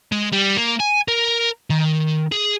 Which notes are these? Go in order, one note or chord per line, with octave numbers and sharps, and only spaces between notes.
G#3
G3
A#3
G#5
A#4
D#3
G#4